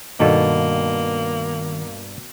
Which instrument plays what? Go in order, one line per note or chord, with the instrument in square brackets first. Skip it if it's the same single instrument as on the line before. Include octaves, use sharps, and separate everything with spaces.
[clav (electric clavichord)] G2 G4 [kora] B2 A4 C#5 [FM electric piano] D#3 [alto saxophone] A#3